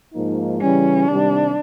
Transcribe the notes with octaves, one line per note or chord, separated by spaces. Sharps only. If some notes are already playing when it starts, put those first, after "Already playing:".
G#2 F3 A#3 D#4
C#3 E3 G3 C#4
C3 D#3 G3 D4